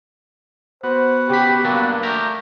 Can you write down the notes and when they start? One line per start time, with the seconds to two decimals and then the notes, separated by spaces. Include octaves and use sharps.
0.84 B3 F#4 C5
1.30 C#3 G4 B5
1.65 G2 F#3 A#3 D4
2.03 A3 G4 A#4